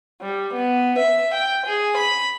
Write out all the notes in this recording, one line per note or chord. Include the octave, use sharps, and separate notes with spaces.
G3
B3
E5
G5
G#4
B5